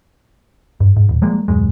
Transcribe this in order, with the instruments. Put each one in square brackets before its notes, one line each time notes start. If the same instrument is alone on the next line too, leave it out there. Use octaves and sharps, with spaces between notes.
[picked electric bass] G2
G#2
D#1
F3 G3 G#3 A#3
D#1 C2 F#2 G#3